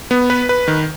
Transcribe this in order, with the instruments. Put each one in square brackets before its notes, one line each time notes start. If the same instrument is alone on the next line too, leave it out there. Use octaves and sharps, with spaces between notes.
[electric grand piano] B3
B4
B4
D#3